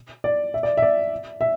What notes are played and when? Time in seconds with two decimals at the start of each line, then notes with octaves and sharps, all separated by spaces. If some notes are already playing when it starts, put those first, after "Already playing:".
0.24 D5
0.54 E5
0.63 D5
0.77 E5
0.82 D5
1.41 E5